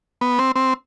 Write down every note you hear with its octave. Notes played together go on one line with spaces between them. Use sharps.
B3
C4
C4